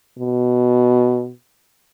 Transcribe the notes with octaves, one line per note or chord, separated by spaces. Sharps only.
B2